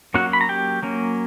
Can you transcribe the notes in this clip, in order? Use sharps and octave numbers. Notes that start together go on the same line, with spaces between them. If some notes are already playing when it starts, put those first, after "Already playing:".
F#3 A#3 C#4 F#4 F#5
B5
A#5
G4 G5
F#3 A#3 C#4